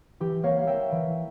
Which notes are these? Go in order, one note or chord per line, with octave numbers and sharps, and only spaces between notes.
E3 G4
A#3 C#5 F5
F5
A#3 E5 G5
E3